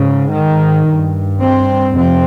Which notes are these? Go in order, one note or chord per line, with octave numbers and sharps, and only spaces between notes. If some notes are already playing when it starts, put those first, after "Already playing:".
Already playing: G#2 C#3
D#3
G2
C4
F2 C3 C4